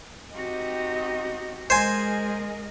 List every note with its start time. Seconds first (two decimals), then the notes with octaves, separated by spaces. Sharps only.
0.35 C4 D#4 F#4 G4 D#5
1.70 G#3 G#4 A#4 C5 D#5 G#5